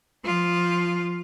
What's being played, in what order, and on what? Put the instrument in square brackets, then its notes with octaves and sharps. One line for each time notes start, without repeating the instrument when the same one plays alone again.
[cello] F3 F4